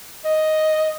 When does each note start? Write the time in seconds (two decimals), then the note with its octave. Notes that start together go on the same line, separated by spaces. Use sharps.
0.25 D#5